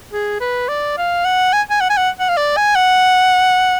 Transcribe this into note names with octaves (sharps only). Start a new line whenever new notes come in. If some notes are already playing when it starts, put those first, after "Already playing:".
G#4
B4
D5
F5
F#5
G#5
G#5
F#5
G#5
F#5
F#5
F5
D5
G#5
F#5